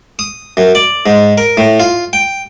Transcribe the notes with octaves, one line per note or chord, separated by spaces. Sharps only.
D#6
F#2
D5
G#2
A#4
A2
F4
G5